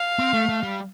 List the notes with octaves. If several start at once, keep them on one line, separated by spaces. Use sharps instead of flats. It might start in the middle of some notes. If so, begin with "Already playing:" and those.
Already playing: F5
C4
A3
A3
G3